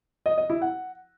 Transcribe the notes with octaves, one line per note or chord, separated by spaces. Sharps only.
D#5
D#5
E4
F#5